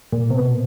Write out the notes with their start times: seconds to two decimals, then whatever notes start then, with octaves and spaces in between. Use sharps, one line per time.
0.12 A#2
0.30 C3
0.37 B2